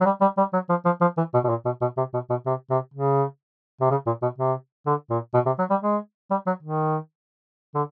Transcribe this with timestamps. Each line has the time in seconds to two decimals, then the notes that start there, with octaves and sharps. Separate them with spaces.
0.01 F#3
0.06 G3
0.21 G3
0.38 G3
0.53 F#3
0.70 F3
0.85 F3
1.01 F3
1.17 E3
1.34 B2
1.44 B2
1.49 A#2
1.65 B2
1.82 B2
1.98 C3
2.14 B2
2.30 B2
2.46 C3
2.71 C3
2.94 C#3
3.81 C3
3.91 C#3
4.06 A#2
4.22 B2
4.38 C3
4.87 D3
5.10 A#2
5.34 B2
5.46 C3
5.59 F#3
5.71 G3
5.82 G#3
6.31 G3
6.47 F#3
6.63 D#3
7.75 D3